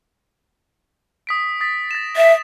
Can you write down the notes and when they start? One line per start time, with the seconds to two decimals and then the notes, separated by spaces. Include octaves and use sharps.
1.27 D#6 B6 D7
1.61 D#6 A6 B6
1.91 A6 A#6 E7
2.16 E5 A6 B6 E7